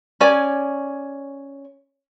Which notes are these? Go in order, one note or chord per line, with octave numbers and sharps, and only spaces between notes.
C#4 C#5 D5 G#5